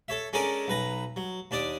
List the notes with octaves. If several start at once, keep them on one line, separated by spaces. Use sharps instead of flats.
A4 C#5 E5
G#3 C#4 D4 A4 A#4 G#5
B1 B4 A#5
F#3
D#2 D4 D5 D#6